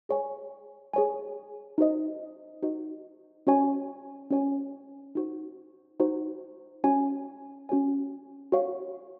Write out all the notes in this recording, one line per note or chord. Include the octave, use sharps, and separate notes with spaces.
G#4 C#5 G#5
G#4 C#5 G#5
D#4 F#4 C5 D#5
D#4 F#4 C5 D#5
C#4 F#4 C#5 G#5
C#4 F#4 C#5 G#5
D#4 F#4 C5
D#4 F#4 C5
C#4 F#4 C#5 G#5
C#4 F#4 C#5 G#5
F#4 C#5 F5